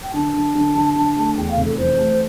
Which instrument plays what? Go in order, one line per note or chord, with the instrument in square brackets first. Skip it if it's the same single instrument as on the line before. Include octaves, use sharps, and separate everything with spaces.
[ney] G5
[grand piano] D3 [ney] A5
[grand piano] D3
D3
D3
D3
A3
[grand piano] E2 [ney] G5
[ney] F5
[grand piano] F1
[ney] A4
[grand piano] E3 [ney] C5
[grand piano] A3